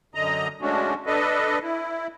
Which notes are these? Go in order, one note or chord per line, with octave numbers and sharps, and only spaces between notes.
F#2 D3 D#5 A#5
G#3 A3 C#4 D4 F#4
D4 A4 B4 D#5
E4